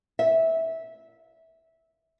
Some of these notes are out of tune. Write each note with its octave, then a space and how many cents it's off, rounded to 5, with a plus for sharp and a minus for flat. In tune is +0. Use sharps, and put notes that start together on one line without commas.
E5 -15